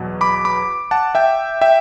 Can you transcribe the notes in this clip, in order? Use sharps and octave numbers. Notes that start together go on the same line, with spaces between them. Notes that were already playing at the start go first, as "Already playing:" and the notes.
Already playing: E2 B2 F#3
B5 D6
B5 D6
F#5 A5
E5 G5
E5 G5